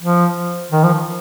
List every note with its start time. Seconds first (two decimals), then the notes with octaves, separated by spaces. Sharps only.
0.02 F3
0.72 D#3
0.84 F3